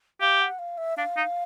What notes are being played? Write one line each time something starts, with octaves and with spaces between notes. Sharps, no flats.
G4 F5
F#5
F5
E5
D4 F5
D#4